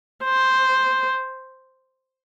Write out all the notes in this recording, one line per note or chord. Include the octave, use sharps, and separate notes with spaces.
C5